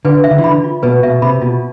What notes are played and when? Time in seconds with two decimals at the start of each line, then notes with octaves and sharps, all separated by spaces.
0.05 D3 B4
0.24 E5
0.31 D3
0.38 E3
0.44 D3 B5
0.64 F4
0.83 B2 B4
1.03 B2 E5
1.22 C3 B5
1.41 B2 F4